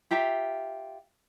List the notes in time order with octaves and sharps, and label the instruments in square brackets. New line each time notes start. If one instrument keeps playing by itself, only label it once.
[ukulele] F4 G4 E5 A#5